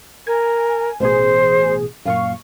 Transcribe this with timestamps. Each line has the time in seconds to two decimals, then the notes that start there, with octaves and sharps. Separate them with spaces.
0.27 A#4 G#5
1.00 A1 B2 G#4 C5
2.05 F#2 A#2 F5 C#6